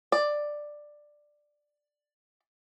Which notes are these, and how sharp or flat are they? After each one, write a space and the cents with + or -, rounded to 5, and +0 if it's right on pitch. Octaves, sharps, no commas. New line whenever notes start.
D5 +10